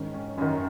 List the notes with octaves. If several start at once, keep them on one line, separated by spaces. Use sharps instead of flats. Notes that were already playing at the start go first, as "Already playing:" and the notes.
Already playing: G#2 D#3 C#4
C#4
F#2 D#3 C#4